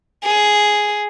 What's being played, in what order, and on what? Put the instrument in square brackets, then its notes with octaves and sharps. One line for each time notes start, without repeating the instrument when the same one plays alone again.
[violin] G#4